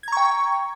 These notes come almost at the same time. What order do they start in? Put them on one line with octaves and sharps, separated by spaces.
G#6 A#5 C#6 G5